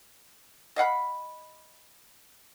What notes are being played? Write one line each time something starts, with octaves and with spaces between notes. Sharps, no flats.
D#5 F5 F#5 B5